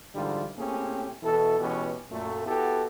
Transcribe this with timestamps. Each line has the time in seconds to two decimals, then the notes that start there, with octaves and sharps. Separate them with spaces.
0.15 G#2 D3 E3 G3 D#4 F4
0.58 A2 A#3 C4 C#4 G4 G#4
1.23 B2 E3 E4 A4
1.59 B2 E3 G#3 B3 C#4 G4
2.10 F#2 A#2 A3
2.46 B3 E4 F#4 G4 A4